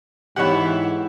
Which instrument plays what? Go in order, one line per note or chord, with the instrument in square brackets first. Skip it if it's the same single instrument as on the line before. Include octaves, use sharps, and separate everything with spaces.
[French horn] G#2 [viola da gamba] E3 E4 [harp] B3 F#5 [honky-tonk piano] G4 C#5